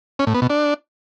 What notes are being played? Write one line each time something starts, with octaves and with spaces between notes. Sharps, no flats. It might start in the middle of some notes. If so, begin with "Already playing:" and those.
C#4
A2
B3
B2
D4